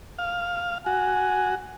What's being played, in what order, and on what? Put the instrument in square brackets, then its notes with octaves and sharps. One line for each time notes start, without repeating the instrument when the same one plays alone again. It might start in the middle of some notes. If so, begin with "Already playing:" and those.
[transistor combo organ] F5
[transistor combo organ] F#4 [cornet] G#5